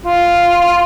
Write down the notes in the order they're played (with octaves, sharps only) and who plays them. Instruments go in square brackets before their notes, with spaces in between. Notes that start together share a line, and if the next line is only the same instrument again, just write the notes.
[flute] F4